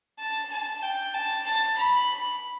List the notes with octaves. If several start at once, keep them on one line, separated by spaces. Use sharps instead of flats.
A5
A5
G5
A5
A5
B5